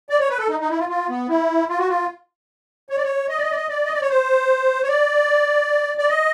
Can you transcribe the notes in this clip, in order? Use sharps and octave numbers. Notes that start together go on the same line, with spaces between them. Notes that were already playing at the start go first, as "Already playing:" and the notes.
D5
C#5
B4
A4
D#4
D#4
E4
F4
F4
B3
E4
F4
F#4
F4
C#5
D5
C#5
D#5
D5
D#5
D5
D#5
D5
D#5
D5
C#5
C5
C#5
D5
D5
D#5